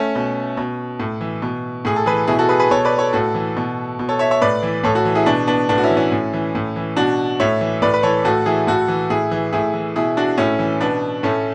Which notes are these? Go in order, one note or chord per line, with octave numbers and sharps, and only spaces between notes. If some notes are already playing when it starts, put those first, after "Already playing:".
Already playing: A3 C#4
B2
B2
A2
E3
B2
A2 G#4
A4
E3 G#4 B4
B2 E4 G#4
F#4 A4
G#4 B4
G#4 B4
B2 A4 C#5
B4 D5
A4 C#5
A2 F#4 A4
E3
B2
B2
A4 C#5
C#5 E5
C#5 E5
A2 B4 D5
E3
A2 A4 C#5
F#4 A4
E3
E4 G#4
B2 B3 D4
B3 D4
A2 B3 D4
F#4
C#4 E4
E3
C#4 E4
A2
E3
A2
E3
B2 D4 F#4
A2 C#5 E5
E3
A2 B4 D5
B4
E3 A4 C#5
A2 F#4 A4
E3 E4 G#4
A2 F#4 A4
E3
A2 E4 G#4
E3
A2 E4 G#4
E3
B2 E4 G#4
D4 F#4
A2 C#4 E4
E3
B2 B3 D4
A2 A3 C#4